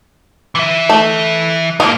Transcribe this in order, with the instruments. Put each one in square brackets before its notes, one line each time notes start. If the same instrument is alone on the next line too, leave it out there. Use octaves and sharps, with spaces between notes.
[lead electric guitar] E3 E5
[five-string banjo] A3
[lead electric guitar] G#2 A#3 [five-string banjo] F5